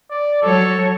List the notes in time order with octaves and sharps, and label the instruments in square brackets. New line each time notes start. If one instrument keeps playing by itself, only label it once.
[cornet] D5
[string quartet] F#3 C#5 [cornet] A4